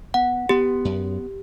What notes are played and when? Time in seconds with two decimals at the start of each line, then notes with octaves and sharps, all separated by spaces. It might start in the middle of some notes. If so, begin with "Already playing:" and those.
0.14 B3 F#5
0.49 B3 G4
0.85 F#2